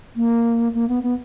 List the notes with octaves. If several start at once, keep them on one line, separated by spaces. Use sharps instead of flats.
A#3
A#3
B3
B3